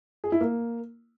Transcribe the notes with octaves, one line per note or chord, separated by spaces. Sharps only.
G#4
E4
A#3